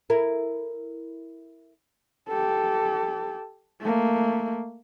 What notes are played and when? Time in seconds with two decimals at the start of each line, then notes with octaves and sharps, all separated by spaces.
0.10 E4 A#4
2.29 G4 A4
3.81 A3 A#3